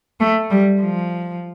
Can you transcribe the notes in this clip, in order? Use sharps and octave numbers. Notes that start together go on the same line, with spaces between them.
A3
G3
F3